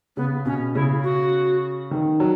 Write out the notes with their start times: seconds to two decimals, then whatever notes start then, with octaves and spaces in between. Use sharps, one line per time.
0.16 C#3 B3
0.45 B2 C#4
0.74 C#3 E4
1.03 F#4
1.91 D#3
2.20 F#3